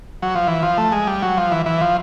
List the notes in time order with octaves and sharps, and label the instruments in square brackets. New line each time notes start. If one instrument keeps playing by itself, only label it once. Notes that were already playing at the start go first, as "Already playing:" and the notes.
[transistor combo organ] F#3
F3
E3
F3
A3
G#3
G3
F#3
F3
E3
E3
F3